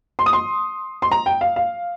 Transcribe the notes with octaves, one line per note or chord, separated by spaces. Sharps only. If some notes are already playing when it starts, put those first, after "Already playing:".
C6
D#6
C6
C6
A#5
G5
F5
F5